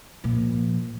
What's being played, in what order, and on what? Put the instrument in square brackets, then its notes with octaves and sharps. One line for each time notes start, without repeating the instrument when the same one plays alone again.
[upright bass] A#2 F3